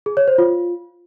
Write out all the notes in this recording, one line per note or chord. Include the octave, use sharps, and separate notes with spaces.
G#4
C#5
C5
F4